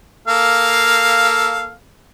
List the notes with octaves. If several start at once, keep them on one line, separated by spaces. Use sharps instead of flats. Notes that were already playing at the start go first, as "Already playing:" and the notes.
A#3 A4 F5